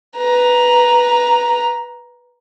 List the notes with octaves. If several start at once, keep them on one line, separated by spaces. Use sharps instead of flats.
B4 A#5